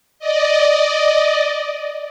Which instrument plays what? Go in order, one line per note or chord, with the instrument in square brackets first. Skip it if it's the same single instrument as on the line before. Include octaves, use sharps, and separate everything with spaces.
[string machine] D5 D#5